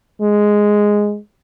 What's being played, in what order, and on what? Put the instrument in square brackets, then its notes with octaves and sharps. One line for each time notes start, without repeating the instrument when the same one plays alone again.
[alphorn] G#3